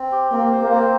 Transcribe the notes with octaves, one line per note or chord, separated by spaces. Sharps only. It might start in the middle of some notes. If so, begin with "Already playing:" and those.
Already playing: C4
G4
A#3 C4
C5
A#3
C4